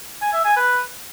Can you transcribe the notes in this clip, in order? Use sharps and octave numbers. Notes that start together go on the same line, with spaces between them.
G#5
E5
G#5
B4